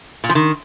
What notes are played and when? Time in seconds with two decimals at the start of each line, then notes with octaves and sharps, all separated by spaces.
0.24 A#2
0.29 F3
0.35 D#3